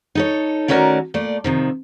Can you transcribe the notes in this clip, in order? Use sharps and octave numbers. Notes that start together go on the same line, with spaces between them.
D#4 A4 C#5
D#3 A3 C#4 F#4 A#4 D5
A#2 A3 D5
C3 D#3 F3